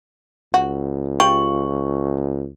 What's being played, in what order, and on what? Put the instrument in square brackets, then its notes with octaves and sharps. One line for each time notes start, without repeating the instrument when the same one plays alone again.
[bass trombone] C#2 [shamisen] F#4
[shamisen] F4 G4 [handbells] C#6